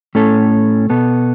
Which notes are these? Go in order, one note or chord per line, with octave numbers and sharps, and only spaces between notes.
A2 A3 C#4 A4
B2 B3 A4